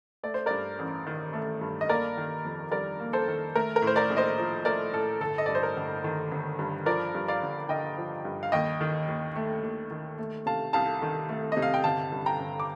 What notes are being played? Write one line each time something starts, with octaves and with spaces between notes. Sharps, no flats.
A3 D5
C5
G2 A#4 D5
A1
D#3
A3
G2
D#5
A#3 A#4 D5
D#3
F2
G3 A#4 D5
A#3
A4 C5
D#3
A3 A#4
A#4
A2
C5
A#4 D5
A#1
C5 D#5
F3
A3 A#4 D5
A2 A4
G1 A4
D#5
G2 D5
C5
A#4
G1
D#3
G1
G2
F3 A#4 D5
G2
D5 F5
G1
D3 D#5 G5
F3
G2
F5
D#2 D#5 G5
D#3
D#2
A3
D#2
D#3
A3
C3 F5 A5
C2 F5 A5
D#3
A3
C3 D#5
F5
G5
G1 F5 A5
G2
G5 A#5
G1
D6